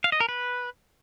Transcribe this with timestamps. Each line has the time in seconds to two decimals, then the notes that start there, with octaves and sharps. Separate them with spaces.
0.04 F5
0.12 D#5
0.20 A#4
0.29 B4